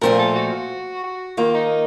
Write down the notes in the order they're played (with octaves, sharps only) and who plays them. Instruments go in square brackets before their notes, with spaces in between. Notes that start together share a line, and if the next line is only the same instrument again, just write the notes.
[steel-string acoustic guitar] A#2 F3 A3 C4 F4 [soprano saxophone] A#4
[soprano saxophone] A4
F#4
F#4
[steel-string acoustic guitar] D#3 A#3 F4
[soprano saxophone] D#4